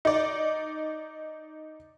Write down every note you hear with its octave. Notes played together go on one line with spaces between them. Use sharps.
D#4 D5